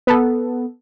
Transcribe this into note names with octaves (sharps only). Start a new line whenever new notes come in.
B3 A4